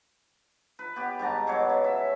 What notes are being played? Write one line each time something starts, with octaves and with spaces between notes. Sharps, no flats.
B4
B3 G4
G#2 G3 A5 A#5
B2 F#3 C#5 D6
C#3
E5